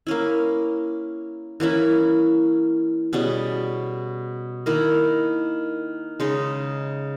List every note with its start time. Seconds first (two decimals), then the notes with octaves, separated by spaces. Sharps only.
0.07 A#3 C#4 E4
1.60 E3 A#3 C#4 E4
3.13 B2 G3 C#4 G#4
4.66 D#3 A#3 E4 A#4
6.20 C#3 G#3 D#4